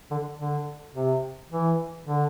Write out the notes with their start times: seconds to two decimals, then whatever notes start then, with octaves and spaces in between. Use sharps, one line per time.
0.11 D3
0.39 D3
0.94 C3
1.51 E3
2.07 D3